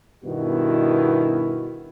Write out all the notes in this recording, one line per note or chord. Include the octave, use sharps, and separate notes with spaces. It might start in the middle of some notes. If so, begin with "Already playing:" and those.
G2 B2 D#3 B3 E4 F#4